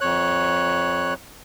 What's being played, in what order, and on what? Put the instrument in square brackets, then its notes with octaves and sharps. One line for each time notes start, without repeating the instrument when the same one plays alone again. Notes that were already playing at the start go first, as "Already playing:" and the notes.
[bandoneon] F2 C#5 F#6